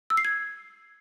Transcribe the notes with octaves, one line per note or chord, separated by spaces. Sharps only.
E6
C7
G#6